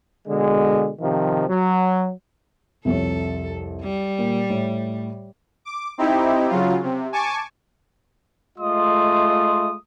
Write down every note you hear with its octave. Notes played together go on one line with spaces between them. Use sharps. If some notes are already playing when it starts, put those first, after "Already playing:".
B2 D3 G#3
C3 D#3 F3
F#3
C2 F2 A4 C#5
G3
A#2
A2
D6
C4 D#4 E4 G4
C#3 F#3 F4
C3
G#5 A5 C#6 D6
G#3 A3 F4 D#5 C6 D#6